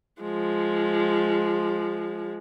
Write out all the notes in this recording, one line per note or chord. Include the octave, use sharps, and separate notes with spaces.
F3 G#3